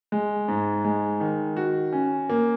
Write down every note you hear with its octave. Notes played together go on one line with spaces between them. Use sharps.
G#3
G#2
G#3
D#3
F#4
C#4
A#3